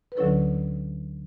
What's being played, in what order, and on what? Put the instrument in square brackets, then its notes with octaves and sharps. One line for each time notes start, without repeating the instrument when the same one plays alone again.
[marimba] B4
D2 D3 F#3 C#4 E4 A4 C#5